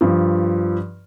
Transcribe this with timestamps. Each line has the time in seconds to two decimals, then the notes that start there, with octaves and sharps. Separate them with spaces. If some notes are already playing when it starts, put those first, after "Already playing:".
0.01 G2 F3